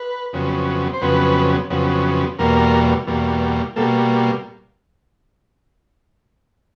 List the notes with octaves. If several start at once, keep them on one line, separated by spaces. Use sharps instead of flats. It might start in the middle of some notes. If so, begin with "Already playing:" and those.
Already playing: B4
F2 C#3 F#3 B3
C5
F2 C#3 F#3 B3 B4
F2 C#3 F#3 B3
E2 B2 G3 A#3 A#4
E2 B2 G3 A#3
B2 G3 A#3 A4